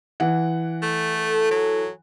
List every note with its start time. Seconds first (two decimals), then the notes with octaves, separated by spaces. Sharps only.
0.20 E3 F#5
0.82 A3
1.15 A4
1.51 F#3